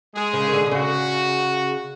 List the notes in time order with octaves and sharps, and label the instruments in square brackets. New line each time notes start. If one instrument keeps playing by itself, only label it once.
[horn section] G#3 G#4
[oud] C#3
D#3
D3
D3
[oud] C#3 [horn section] F#4